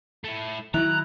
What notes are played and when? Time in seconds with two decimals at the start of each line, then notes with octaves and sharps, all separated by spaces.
0.24 A3 E4
0.74 D#3 F3 F#3 E4 A#5 F#6